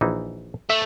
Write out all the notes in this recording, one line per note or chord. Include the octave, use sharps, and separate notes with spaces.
A#1 E3 D#4
A3 E5